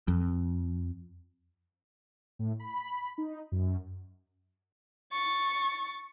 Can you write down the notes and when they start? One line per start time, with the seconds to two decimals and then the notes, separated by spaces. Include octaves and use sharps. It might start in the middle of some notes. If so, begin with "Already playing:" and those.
0.08 F2
2.39 A2
2.60 B5
3.18 D#4
3.52 F#2
5.12 C#6 A6